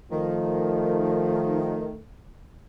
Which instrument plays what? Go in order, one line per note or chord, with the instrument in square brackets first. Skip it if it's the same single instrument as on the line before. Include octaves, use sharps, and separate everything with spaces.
[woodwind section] D#3 [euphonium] F3 [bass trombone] A3